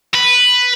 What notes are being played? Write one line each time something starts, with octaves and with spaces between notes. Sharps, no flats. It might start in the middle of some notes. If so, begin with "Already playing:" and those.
B4